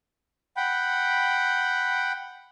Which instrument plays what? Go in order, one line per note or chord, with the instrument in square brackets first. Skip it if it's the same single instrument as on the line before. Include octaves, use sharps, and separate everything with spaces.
[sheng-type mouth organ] F#5 G5 B5